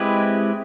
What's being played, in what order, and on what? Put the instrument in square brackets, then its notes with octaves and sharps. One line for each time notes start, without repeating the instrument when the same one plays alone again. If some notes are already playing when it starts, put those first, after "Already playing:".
Already playing: [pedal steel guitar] G#3 C4 E4 G4 B4